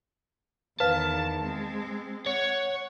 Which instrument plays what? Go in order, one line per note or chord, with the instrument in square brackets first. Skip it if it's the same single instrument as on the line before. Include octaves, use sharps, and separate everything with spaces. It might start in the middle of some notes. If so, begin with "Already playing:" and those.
[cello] E2 D#3 [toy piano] B4 F5 [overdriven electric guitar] A5
[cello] G#3 C4
[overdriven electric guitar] C#5 [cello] F#5